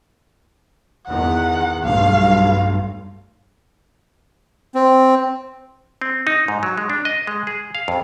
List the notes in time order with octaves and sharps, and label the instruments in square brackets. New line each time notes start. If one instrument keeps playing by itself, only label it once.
[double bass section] E2 D#3 [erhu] F#5
[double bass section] B1 G2 A3 [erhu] F5
[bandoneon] C4
[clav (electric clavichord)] C4
D#4
G#2
F#3
G#3
D4
D#5
G#3
G#4
F5
F2